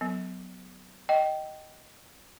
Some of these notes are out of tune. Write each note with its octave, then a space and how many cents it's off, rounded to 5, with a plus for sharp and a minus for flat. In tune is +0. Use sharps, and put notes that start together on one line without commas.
F#3 +0 B3 +15
D#5 +0 G5 -20